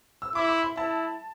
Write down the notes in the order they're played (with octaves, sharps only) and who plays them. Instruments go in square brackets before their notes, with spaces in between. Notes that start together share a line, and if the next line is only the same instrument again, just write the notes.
[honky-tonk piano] E6
[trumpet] E4 [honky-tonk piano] D6
[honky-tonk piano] C6
B5
[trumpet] E4 [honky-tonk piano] A5